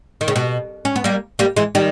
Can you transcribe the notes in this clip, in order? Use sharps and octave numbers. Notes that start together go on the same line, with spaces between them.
D#3
C#3
B2
C#4
B3
G3 A#3
G3 A#3
E3 G#3
D#3 G3